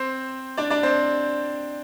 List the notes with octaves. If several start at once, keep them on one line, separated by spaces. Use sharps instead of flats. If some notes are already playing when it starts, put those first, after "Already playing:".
Already playing: C4 C5
D4 D5
D4 D5
C4 C5